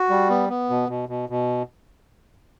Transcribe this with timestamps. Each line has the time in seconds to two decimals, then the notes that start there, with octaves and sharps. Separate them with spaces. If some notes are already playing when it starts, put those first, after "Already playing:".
Already playing: F#4
0.10 G3
0.29 B3
0.49 B3
0.70 B2
0.89 B2
1.09 B2
1.29 B2